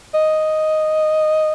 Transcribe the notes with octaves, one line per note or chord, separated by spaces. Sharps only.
D#5